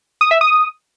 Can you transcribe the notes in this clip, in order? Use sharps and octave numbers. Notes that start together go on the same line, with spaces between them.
D#6
E5
D#6